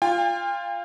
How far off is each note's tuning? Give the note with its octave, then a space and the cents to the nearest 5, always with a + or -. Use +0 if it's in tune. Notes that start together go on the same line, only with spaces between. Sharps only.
F4 -5 G5 +45